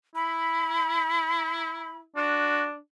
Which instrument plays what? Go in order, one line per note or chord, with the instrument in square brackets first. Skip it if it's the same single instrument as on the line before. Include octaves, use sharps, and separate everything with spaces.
[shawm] E4 [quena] B5
[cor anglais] D4 [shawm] F#4